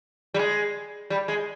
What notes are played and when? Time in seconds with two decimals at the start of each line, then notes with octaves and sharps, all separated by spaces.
0.34 G3
0.39 G#3
1.10 G3
1.28 G#3